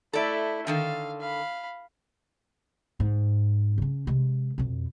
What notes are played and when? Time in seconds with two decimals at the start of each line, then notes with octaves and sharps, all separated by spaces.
0.13 A3 E4 A4 D5
0.67 D3 D#3 A4 F5
1.20 F5 B5
3.00 G#2
3.78 C#3 C#4
4.07 C3 G#3
4.58 F2 B2